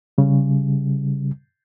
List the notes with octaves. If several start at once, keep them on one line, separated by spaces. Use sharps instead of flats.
C#3 G3